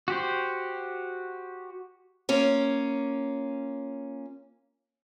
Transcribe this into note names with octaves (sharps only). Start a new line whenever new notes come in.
F#4 G4 C5
A#3 C#4 F4